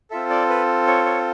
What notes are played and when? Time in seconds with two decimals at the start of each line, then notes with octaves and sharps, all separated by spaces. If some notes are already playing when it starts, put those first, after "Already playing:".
0.11 C4 F4 A4 E5
0.30 D5
0.49 B4
0.87 C#5
1.06 C#5